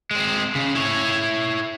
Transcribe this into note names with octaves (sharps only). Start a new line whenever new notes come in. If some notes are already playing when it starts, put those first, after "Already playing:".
G#3 C4
C#3
E4 C#5